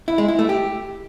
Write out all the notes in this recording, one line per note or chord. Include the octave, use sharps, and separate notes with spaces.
E4
G#3
E4
A3
G4